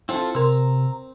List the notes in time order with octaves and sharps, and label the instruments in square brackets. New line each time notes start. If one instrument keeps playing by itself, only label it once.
[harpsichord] C4 [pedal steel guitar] E4 F4 A4
[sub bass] C3 [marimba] A#4 C6 [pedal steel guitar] A#5 E6